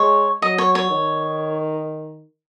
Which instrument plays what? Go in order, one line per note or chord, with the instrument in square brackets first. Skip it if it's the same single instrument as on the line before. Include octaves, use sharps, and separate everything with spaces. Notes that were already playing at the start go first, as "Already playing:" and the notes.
Already playing: [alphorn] G#3 [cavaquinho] C#5
[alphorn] F#3 [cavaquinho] D#5
[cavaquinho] C#5
C#5
[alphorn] D#3